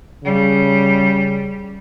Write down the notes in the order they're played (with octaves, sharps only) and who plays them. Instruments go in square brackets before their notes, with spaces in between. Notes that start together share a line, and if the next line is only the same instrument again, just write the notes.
[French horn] C#3 [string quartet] G3